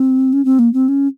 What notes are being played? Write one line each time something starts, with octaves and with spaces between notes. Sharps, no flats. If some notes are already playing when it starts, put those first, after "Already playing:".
Already playing: C4
C#4
C4
A#3
C4
C#4